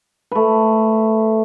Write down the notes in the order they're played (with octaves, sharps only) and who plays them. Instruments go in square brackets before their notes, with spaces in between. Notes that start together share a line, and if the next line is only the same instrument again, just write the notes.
[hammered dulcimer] A3 B4